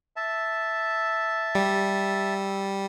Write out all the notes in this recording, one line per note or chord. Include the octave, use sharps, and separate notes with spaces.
E5 A5
G3